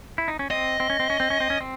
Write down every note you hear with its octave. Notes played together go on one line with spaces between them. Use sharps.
E4
D#4
C#4
C4 D#5
C4
C#4
C4
C#4
C4
C#4
C4
C#4
C4